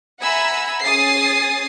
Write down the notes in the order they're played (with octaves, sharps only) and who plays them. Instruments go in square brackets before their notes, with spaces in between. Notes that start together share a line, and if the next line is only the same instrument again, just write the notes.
[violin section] E5 F#5 G#5 A#5 B5 E6
C#4 G#4 G#5 D#6 A6 C7